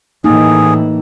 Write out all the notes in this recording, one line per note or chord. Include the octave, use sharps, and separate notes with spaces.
A2 E3 A#3 D#4 G#4